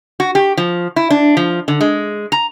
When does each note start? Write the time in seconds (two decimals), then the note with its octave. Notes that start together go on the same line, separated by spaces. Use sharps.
0.20 F#4
0.35 G4
0.57 F3
0.96 E4
1.10 D4
1.37 F3
1.68 D3
1.81 G#3
2.32 A#5